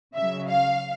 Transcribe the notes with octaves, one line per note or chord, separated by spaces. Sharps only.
C#3 F#3 E5
F5